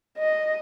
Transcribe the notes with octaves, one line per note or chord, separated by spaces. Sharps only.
D#5